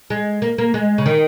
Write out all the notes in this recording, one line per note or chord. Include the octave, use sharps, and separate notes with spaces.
G#3
A#3
A#3
G#3
C#3
D#3